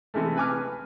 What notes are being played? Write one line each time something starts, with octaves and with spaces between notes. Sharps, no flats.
C3 E3 G#3 A3
B4 G#5 D6 F6